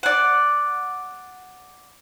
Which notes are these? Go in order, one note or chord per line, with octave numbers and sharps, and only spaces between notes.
D5 F#5